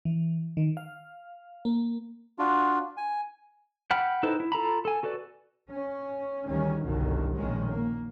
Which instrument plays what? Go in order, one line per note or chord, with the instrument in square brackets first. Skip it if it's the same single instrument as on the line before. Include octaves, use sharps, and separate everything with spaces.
[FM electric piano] E3
D#3
F5
A#3
[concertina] D4 F4 F#4
G#5
[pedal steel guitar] F#5 G5 B5 F6
D#4 E4 A4 B4 C5
E4
F4 A4 A#5 B5
A4 G#5
F#4 A4 B4 D5
[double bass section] C#4
D2 D#3 E3 G3 C#4
G1 C2 F#2 B2 D3 D#3
A#1 F#2 B2 D#3 G#3 C#4
A#3